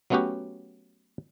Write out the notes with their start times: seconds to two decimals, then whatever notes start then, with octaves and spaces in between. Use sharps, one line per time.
0.10 F#3 A3 B3 C#4 F#4 G4